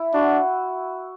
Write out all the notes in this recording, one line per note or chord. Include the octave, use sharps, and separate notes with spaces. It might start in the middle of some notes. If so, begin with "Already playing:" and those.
Already playing: E4
D4 F#4